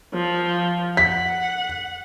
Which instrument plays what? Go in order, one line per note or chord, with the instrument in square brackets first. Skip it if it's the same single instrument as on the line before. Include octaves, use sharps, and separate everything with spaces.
[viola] F3
[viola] F#5 [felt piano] B6